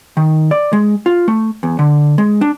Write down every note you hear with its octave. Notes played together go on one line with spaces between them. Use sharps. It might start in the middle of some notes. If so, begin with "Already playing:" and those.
D#3
D5
G#3
F4
A3
E2
D3
G#3
D4